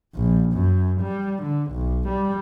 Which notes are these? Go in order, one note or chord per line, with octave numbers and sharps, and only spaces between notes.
A#1
F#2
G3
D3
B1
G3